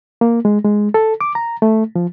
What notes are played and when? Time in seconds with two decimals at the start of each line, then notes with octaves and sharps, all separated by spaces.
0.21 A#3
0.45 G#3
0.65 G#3
0.94 A4
1.21 D6
1.35 A#5
1.62 A3
1.96 F3